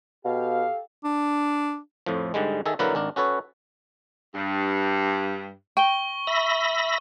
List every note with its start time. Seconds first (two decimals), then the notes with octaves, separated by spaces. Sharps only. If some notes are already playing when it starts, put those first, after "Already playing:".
0.25 B2 G4 A4 F5
1.04 D4
2.06 F2 A2 F3
2.34 G#2 D3 G3 G#3
2.66 D#3 G#4 A4 E5
2.79 D3 F#3 A#3 E4 A#4 B4
2.95 G#1 D4 A#4
3.16 C#4 F#4 A4 B4 C#5
4.35 G2
5.77 G5 C#6 G7
6.27 E5 B5 A#6